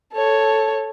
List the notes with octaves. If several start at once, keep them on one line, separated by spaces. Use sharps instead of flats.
A4 C#5